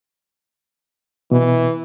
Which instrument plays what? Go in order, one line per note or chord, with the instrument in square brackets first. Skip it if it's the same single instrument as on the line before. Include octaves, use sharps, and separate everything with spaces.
[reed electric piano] B2 [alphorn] E3